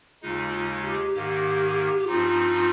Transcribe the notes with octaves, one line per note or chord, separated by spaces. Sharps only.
D#2 C#3 G#3 D#4 F4
F4
G4
G#2 D#3 A#3 G4
G4
G2 F3 C4 D#4 F4
F4